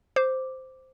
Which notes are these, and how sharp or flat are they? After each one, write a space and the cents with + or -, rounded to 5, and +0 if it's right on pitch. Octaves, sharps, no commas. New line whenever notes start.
C5 -5 D6 +0